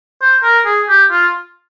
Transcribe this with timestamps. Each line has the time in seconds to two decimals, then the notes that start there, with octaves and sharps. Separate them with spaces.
0.22 C5
0.43 A#4
0.66 G#4
0.89 G4
1.11 F4